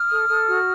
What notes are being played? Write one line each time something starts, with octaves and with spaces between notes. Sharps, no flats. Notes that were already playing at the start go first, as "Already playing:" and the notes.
Already playing: D#6 F6
A4
A4
F#4